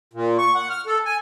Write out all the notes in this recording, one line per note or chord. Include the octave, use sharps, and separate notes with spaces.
A#2
C#6
F#5
F6
A4
G#5